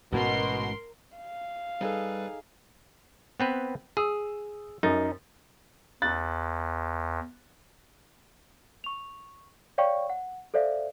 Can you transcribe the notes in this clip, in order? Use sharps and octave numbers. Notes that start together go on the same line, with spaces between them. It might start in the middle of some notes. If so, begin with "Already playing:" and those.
A1 G#2 B2 C#4 A#4 C6
F5
G3 D#4 G#4 A4 B4
B3 C4 B4
G#4 D#6 E6
F#2 D#4 A#4 A6
E2 F#6 A6
C#6 F7
C#5 D5 F5 G5 C#6
F#5
A4 C5 D5 E5 F5